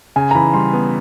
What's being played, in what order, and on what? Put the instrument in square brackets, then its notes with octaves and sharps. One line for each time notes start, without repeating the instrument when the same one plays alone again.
[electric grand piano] C#3 [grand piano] G#5
[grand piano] A#5
[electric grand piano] E3 [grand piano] B5
[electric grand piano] G3 [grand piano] C6
[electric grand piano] B3